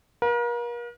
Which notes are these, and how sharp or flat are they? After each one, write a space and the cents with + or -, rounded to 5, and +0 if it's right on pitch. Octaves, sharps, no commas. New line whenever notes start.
A#4 +40 F5 +30